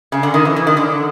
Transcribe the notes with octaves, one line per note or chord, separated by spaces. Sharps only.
C#3
D3
D#3
E3
E3
D#3
D3